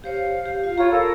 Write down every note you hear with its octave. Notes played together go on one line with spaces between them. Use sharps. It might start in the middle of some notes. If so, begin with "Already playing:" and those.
G4 C5 C#5 F5
G4
F4 F5
F4 C#5 A#5 B5 C#6
A4 A#4